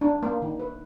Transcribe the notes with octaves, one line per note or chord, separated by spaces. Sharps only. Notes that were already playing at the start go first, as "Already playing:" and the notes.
D4
A#3
D#3
B4